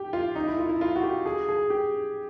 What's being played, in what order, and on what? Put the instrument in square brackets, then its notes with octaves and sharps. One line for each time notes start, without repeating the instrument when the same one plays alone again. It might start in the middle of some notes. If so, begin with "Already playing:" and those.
Already playing: [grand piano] G4
F4
D#4
E4
F4
E4
F4
F#4
G4
G#4
G#4
G4